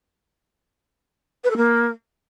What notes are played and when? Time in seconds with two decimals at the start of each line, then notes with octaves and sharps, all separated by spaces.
1.44 B4
1.50 A4
1.56 A#3